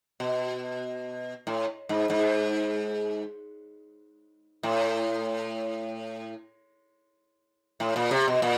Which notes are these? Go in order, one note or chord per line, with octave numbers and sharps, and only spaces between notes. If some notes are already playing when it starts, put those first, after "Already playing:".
B2
A2
G#2
G#2
A2
A2
A#2
C3
B2
A#2